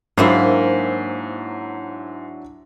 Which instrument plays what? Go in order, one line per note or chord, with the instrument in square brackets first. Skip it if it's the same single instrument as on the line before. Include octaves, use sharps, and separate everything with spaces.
[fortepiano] G#2 B5 [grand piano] F#3 D4 E4 [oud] A#3 C5 E5